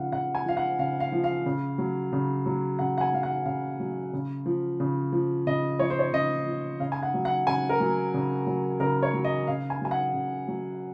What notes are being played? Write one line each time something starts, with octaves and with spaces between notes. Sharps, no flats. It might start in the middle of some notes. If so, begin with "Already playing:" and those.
Already playing: C#3 F3 F5 F#5
C#3 F#5
G#5
F3 F5
F#5
C#3 F5
F5
F3
F5
C#3
F#3
C#3
F#3
C#3 F#5
F#5
G#5
F#3 F5
F#5
C#3 F5
F#3
C#3
F3
C#3
F3
C#3 D#5
F3 C#5
C5
C#5
C#3 D#5
F3
C#3 F5
G#5
F#5
F#3
F#5
C#3 G#5
A#4
F#3
C#3
F#3
C#3 A#4
C#5
F#3
D#5
C#3 F5
G#5
F#3 G#5
F#5
C#3
F#3